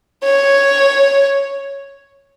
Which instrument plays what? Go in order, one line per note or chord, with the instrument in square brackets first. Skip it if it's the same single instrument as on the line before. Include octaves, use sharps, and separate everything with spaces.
[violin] C#5